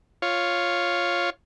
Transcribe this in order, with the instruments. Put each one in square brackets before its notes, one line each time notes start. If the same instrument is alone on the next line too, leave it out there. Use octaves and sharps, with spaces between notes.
[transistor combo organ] F4 C#5